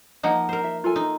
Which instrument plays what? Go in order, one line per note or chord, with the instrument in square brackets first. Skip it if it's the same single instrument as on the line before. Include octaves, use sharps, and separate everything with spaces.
[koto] F3 A#3 D#4 [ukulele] D#5 F#5
[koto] A#4 C5
[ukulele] E5
F4 A4 G#5
[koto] D#4